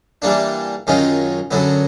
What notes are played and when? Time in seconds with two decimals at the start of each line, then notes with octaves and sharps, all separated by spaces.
0.22 E3 G3 A#3 D4
0.87 F#2 D#3 G#3 C#4 F4
1.51 F#2 D3 F#3 B3